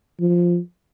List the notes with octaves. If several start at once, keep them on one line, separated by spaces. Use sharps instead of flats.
F3